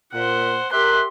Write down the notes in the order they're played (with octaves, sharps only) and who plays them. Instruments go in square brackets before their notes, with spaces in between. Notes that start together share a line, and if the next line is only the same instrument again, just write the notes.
[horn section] A#2 [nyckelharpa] C5 F#5
[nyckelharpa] G4 C6 [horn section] A#4 E5 [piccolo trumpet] F#6